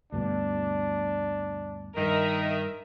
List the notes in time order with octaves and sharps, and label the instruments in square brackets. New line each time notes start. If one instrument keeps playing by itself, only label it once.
[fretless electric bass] D2 G2 B2 [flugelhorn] D4
[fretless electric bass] G2 [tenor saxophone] D#3 [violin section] A#4 D#5 E5